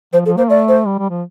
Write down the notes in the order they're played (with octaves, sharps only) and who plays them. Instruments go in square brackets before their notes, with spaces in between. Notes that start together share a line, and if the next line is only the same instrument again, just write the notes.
[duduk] F3 [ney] C5
[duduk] F3 [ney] A4
[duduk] A#3 [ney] C5
[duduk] A3 [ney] D5
[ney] C5
[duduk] G3
G3
F3